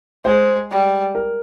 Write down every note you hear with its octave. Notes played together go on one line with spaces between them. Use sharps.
G#3 C5
G3
A#4